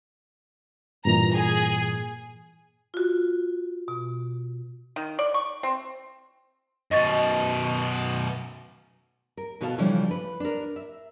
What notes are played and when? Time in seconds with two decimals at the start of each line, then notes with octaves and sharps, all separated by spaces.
1.05 G2 A#2 E3 A#5
1.35 G#4
2.94 F4 F#4
3.88 B2
4.96 D#3
5.19 D5
5.34 C#6
5.63 C4
6.91 F#2 B2 D#5 C#6 A6
9.37 A#4
9.61 B2 B3 F#4 A4 F5 A5
9.78 C#3 E3 F3 G3 A3 D4
10.11 B4
10.40 D4 A#4
10.76 E5